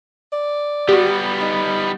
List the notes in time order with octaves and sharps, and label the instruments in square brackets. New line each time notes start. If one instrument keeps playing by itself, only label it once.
[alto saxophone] D5
[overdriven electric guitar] G3 B3 [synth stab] F#4 G4
[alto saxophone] D#4